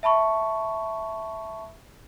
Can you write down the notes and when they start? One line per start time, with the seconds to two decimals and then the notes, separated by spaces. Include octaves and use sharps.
0.03 E5 A5 B5 C#6